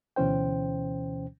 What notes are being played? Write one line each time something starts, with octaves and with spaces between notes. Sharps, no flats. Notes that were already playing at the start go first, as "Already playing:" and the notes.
D2 B2 E3 C#4 C5 G5